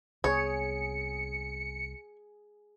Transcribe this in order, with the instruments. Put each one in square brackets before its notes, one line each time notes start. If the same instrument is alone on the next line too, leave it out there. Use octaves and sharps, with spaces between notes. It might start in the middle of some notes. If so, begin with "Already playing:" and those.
[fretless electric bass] C2 B3 [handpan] G#4 [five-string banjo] C#5 [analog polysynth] C#7